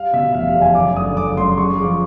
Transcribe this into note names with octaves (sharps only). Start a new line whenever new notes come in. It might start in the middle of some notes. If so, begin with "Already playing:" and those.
Already playing: G3 F5
B2 E5
F1 F5
F5
E2
G#5
F#1 D6
D3 D#6
F#1 D6
F#2 C6
G#3 C#6
F3 D6